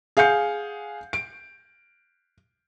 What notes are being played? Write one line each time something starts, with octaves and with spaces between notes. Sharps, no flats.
G#4 F5 F#5 G6 C#7
D7